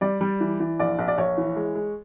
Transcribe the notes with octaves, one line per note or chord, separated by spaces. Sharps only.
G3 D5
G3
E3
E3
A#1 D5
A#1
D5
A#1 C#5
E3
G#3
G#3